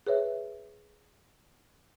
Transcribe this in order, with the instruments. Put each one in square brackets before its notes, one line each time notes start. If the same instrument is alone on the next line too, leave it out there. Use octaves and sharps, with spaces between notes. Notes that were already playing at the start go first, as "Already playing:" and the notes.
[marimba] G#4 B4 C#5 E5